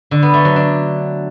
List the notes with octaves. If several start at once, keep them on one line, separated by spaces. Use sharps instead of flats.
D3
B3
A3
F#3
D4